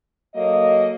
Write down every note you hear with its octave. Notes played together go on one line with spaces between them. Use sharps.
F#3 A#3 A4 D#5